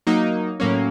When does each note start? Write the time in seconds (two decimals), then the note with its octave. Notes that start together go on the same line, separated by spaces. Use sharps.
0.07 F#3 A#3 D#4
0.60 A2 F#3 A#3 C#4